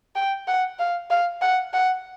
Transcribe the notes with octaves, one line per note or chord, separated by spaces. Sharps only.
G5
F#5
F5
F5
F#5
F#5